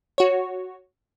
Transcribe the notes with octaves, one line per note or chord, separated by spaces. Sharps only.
F#4 C#5